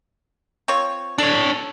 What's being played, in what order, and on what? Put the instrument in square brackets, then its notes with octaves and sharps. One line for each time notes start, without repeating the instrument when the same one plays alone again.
[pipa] C4 F4 C#5
[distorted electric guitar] D4 C#5 [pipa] A4